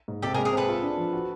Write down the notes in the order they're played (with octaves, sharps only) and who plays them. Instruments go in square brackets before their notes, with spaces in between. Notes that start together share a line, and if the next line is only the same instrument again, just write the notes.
[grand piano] G#2
[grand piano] C3 [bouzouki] G4 A4
[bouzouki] G#4 A#4
[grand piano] G#3
[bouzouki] G#4 A#4
[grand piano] C4 [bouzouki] A4 B4
[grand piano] F4
D4
F3
F#4